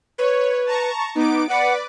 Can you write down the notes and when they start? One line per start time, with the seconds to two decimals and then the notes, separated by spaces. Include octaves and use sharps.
0.18 B4 C#5
0.66 A5 A#5 C#6
1.15 B3 D#4 D6 D7
1.49 B4 D5 F#5 D6